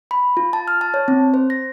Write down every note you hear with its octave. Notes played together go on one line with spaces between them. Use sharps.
B5
F4
A5
F6
A5
C#5
C4
C5
A#6